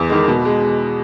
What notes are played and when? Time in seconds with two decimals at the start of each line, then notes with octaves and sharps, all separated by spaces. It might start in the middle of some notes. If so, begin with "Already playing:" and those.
Already playing: E2
0.10 D#3 G#3
0.28 B2
0.45 G#3